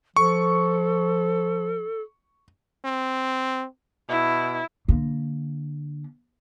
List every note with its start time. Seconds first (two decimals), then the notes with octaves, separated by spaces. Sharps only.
0.16 F3 A4 C#6
2.85 C4
4.09 B2 E4
4.88 D3 A#3